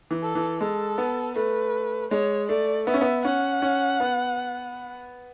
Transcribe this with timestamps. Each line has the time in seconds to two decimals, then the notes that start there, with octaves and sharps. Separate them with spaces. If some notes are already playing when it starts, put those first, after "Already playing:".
0.11 E3
0.23 A4
0.35 E3
0.61 G#3 A4
0.98 B3
1.35 A3 B4
2.11 G#3 C#5
2.49 A3 D5
2.87 B3 E5
2.94 C#4
3.01 B3
3.25 C#4 F#5
3.62 C#4
4.00 B3